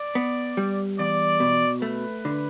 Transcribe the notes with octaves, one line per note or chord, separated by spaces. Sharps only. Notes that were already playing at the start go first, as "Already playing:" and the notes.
Already playing: D5
B3
G3
E2 D5
B2
A3 B4
D3